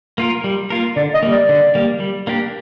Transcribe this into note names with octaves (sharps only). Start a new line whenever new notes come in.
A#3 F4 A#4
G3
A#3 F4 A#4
D3 D5
D#5
G3 A#3
D5
D3
G3 A#3
G3
A#3 D4 G4